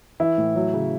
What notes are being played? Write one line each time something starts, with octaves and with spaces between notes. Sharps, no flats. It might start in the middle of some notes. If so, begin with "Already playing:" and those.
E3 E4
A2
F#3
C#3